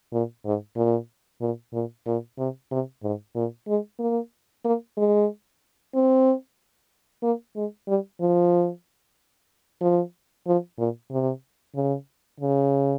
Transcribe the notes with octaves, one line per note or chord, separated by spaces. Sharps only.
A#2
G#2
A#2
A#2
A#2
A#2
C3
C3
G#2
A#2
G#3
A#3
A#3
G#3
C4
A#3
G#3
G3
F3
F3
F3
A#2
C3
C#3
C#3